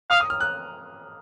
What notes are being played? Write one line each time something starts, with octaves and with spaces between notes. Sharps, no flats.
F5 D#6
D#6
F6
F#6